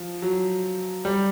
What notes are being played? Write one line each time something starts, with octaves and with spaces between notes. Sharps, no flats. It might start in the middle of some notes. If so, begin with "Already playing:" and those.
Already playing: F3
F#3
G3